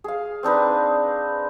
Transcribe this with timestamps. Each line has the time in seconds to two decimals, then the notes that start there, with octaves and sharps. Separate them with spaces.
0.04 G#4 F5
0.43 C4 D4 D#4 B4